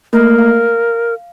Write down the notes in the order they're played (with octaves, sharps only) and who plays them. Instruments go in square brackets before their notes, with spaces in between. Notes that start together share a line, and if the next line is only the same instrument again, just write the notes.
[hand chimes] A3 A#3 [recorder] A#4
[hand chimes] F5